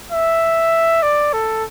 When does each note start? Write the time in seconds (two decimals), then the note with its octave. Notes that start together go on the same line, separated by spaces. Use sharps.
0.12 E5
1.02 D5
1.33 A4